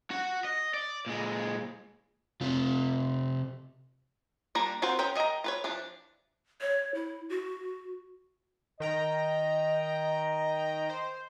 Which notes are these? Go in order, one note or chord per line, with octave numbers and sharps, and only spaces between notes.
F#4
D#5
D5
A#2 G#3
C3 F4
G3 A#3 D4 F4 A#5
C4 F4 F#4 A#4 C5
C#4 G#4 A#4 C5 G5
A#4 D#5 E5 G5 A#5
F4 B4 C#5
E3 F3 D4
C#5
E4
F#4
D#3 D#5 G5 A#5
C5